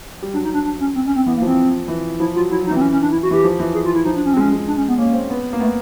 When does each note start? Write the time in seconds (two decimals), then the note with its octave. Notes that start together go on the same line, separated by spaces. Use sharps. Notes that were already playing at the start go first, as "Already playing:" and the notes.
0.22 G3
0.34 F#3 D4
0.44 D#4
0.54 D4
0.64 D4
0.80 C#4
0.95 C4
1.06 C#4
1.16 C4
1.26 E3 B3
1.37 A#3
1.42 F3
1.47 C4
1.88 E3
2.19 F3 E4
2.35 F#3 F4
2.50 F#3 E4
2.60 F#3
2.67 D#4
2.71 E3
2.76 C4
2.81 C#4
2.92 C#4
3.02 D4
3.12 E4
3.23 F#4
3.31 E3 G4
3.44 F3
3.60 E3
3.74 G#4
3.85 F4
3.95 E4
4.05 F3 D#4
4.16 D4
4.26 C#4
4.34 C4
4.37 G#3 C#4
4.52 G#3
4.67 D4
4.77 C#4
4.88 B3
4.98 A#3 C#4
5.14 C4
5.30 B3
5.53 A#3
5.60 A3 B3